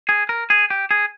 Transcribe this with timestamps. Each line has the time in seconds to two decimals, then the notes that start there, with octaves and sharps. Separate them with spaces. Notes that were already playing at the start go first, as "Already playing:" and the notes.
0.09 G#4
0.29 A#4
0.50 G#4
0.70 G4
0.91 G#4